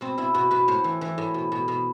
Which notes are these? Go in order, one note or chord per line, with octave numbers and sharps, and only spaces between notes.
B2 C4
B2 E4
B2 F#4
B2 B4
A2 C5
E3
E3
A2
B2
B2
B2